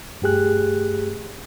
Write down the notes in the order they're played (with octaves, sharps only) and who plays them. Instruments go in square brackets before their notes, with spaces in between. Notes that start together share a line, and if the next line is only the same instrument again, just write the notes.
[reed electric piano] G2 A3 G4 G#4 F#6